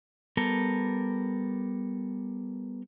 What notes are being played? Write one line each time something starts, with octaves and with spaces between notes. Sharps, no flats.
G3 B3 A4 A#4